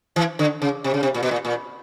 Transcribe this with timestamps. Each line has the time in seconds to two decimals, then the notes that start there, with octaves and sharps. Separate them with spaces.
0.16 E3
0.39 D3
0.62 C#3
0.84 C3
0.94 C#3
1.03 C3
1.14 A#2
1.23 B2
1.31 A#2
1.45 A#2